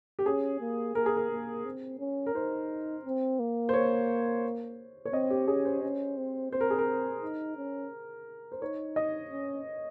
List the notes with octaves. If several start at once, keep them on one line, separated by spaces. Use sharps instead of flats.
G4
C#4 G#4
A#3
A#3 A#4
G#4
A#4
A#3
C4
C#4
A#4
D#4 C5
C4
A#3
C5
C#5
C#5
C4 D#5
G4
C#4 G#4
C5
C#4
C4
C4 C5
A#4
G#4
A#4
D#4
C#4
C5
D#4 C#5
D#5
C#4